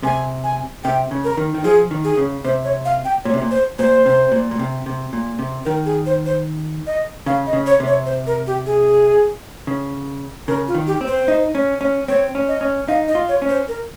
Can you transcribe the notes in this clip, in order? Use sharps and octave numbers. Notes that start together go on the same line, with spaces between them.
C3 G#5
G#5
C3 G5
C#3
A#4
D#3
D#3
F3 G#4
D#3
G#4
C#3
C3 C5
C#5
F5
G5
A#2 C#5
C3
A#2
C5
A#2 C5
C3
A#2
A#2
C3
C3
A#2
C3
D#3 A#4
G#4
C5
C5
D#5
C#3 F5
D#5
C#3
C#5
C3
C#5
C5
A#4
G4
G#4
C#3
C#3 A#4
F4
D#3
G4
C4
C5
D#4
C#4
C#4
C4 C#5
C#4
D#5
C#4
D#4 F5
D#5
F4
C#5
C#4
C5
A#4